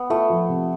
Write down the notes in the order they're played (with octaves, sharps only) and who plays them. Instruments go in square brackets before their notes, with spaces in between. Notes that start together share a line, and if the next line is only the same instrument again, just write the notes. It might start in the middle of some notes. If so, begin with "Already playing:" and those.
Already playing: [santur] B3
[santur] A3 [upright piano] F4
[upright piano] F3
C3